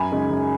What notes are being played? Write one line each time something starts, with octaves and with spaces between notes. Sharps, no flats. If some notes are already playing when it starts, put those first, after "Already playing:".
Already playing: F#2 G#5 B5
C#3 G#3 D#4
F#2